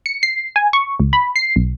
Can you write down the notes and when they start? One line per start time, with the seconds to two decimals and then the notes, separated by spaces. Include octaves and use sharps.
0.06 C#7
0.23 C7
0.56 G#5
0.73 C#6
1.00 C#2
1.13 B5
1.36 C7
1.56 B1